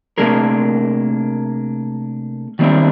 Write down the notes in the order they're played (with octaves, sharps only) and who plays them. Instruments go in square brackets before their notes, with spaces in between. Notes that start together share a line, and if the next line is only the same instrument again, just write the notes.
[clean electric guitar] C3 A3 A#3 D4 G#4 A#4
D#3 G3 A#3 C4 D4 E4